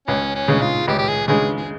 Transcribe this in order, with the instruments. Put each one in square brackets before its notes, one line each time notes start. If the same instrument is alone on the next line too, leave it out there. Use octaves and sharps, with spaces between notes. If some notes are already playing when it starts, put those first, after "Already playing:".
[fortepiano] C#2 [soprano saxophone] C#4
[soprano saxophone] C#4
[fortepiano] C#3 G#3
[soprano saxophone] F4
[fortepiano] C#2 [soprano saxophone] G4
[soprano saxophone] G4
G#4
[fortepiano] C#3 G#3 [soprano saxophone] G#4
[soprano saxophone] G#4